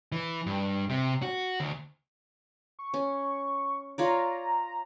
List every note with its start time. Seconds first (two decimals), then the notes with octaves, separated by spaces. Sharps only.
0.12 E3
0.46 G2
0.90 C3
1.22 F#4
1.60 D2
2.79 C#6
2.94 C#4
3.98 F4 C#5 D5 A#5